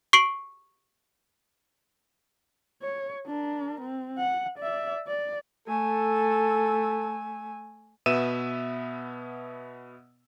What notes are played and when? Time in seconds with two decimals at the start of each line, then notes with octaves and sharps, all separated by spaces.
0.13 C#6 C7 D7 F#7
2.82 C#5
3.27 D4 A#4
3.81 C4
4.18 F#5
4.58 D5 E5
5.08 D5
5.68 A3 A4 G#5
8.06 B2 B3 E5 E6 D#7 E7